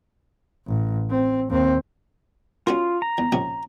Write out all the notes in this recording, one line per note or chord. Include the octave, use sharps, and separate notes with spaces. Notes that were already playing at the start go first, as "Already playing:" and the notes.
A1
C4
D#2 C4
C#4 F4 F#4 A#4
A#5
E2
A#1 C3 C#4